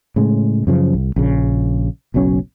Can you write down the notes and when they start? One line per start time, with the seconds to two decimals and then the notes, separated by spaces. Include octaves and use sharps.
0.16 A2 C#3 G#3
0.67 F#2 C#3 F3
0.94 C2
1.16 A#1 C#3
2.14 F#1 B1 F#3 C#4